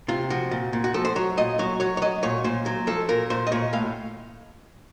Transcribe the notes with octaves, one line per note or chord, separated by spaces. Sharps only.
C3 F4
F3 F#4
A#2
A#2
F#4
F3 A4
C5
F#3 C#5
A#2 D#5
F#3 C#5
F#3 C#5
C#5
F#3 D#5
A#2 C#5
A#2 C5
F#3
F3 A4
A#2 A#4
A#2 C5
D#5
A#2 C#5
A2 F5